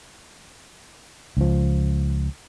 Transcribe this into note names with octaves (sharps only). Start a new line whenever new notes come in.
C#2 F3